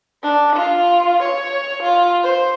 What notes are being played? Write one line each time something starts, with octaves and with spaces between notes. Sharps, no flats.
D4
F4
C#5
F4
C5